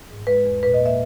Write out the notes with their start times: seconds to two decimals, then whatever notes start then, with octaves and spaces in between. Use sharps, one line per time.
0.10 G#2
0.27 G#3 B4
0.46 E2
0.63 A#2 B4
0.74 D#5
0.80 A#3
0.86 E5